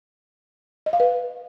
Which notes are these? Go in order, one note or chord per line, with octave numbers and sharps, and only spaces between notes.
D#5
F5
B4